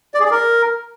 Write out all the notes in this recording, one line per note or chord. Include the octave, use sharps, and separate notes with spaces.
D5
G#4
D5
A#4